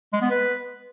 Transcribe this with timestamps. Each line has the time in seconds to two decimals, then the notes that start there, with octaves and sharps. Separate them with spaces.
0.13 G#3
0.22 B3
0.31 B4